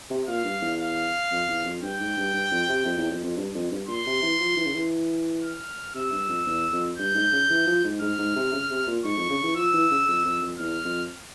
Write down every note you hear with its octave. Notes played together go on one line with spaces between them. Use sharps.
C3
A#2 F5
G2
E2
F5
F2
E2
F2
G2 G5
G#2
G2
G2
F2
C3
F2
E2
F2
F2
G2
F2
G2
A#2 C6
C3
E3
F3
E3
C#3
E3
F6
C3 E6
G2
F2
E2
F2
G2 G6
G#2
C#3
E3
F3
G#2
G#2 F6
G#2
C3
C#3
C3
A#2
G#2 C#6
F2
C#3
E3
F3 E6
E3
C#3
F2
F2
F2
E2 F6
F2